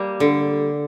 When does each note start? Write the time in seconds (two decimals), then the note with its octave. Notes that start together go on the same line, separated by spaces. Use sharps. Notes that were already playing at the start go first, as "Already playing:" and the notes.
Already playing: G3 A#3
0.20 D3